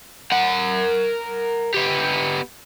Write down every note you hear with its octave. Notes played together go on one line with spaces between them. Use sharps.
A#4 F#5
B3 G4